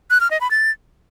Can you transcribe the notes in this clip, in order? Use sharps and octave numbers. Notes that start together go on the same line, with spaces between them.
F#6
F6
D#5
B5
A6